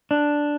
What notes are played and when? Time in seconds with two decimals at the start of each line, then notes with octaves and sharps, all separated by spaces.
0.11 D4